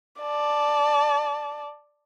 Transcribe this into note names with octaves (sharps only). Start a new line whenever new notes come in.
D5 A5